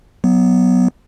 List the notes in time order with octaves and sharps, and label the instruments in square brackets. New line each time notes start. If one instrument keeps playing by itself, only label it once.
[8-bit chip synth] F#3 B3